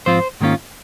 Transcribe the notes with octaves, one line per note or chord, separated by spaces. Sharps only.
G#2 F3 C4 F4 C5
G#2 D#3 A#3 C#4 F4